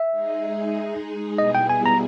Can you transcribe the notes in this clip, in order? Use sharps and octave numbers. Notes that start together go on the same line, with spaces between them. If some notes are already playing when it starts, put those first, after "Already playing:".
Already playing: E5
G#3 D#4 G#4
B2 G3 B3 E4 G#4 D#5
G5
G#5
A#5